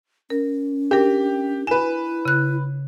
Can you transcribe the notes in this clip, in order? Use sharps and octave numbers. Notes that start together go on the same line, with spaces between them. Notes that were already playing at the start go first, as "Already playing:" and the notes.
C#4 A#4
D4 G4 A#4
E4 B4 G#5 E7
C#3 F#6